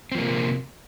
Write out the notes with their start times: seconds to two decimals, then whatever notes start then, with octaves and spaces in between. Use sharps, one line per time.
0.12 C4
0.15 F3
0.18 A#3
0.22 C3